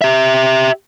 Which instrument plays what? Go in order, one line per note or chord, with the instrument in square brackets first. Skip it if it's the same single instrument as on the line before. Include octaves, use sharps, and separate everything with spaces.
[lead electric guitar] G4 E5